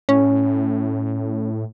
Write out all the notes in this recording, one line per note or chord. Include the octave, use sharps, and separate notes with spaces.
A2 C#4